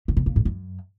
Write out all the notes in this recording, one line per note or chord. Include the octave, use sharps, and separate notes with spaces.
D3
B2
A#2
G#2
F#2